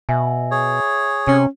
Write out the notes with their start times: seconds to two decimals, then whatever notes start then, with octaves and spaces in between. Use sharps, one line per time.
0.09 B2 E5 G#5
0.51 G#4 C#5
1.27 C3 C#4